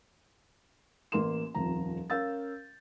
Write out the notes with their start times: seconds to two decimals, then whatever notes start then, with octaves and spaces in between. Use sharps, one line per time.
1.12 A1 A#3 A#4 C6 E7
1.55 D#1 F2 F3 A#5
2.10 C#4 A#4 F5 E6 G6 A6